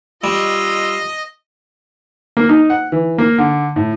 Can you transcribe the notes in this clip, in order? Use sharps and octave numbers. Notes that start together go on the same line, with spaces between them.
G3 F4 D#5 E6
A#3
D#4
F#5
E3
A#3
D3
A2